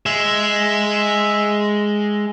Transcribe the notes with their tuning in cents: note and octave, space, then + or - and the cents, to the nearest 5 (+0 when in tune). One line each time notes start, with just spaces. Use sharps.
G#3 +0 E5 +0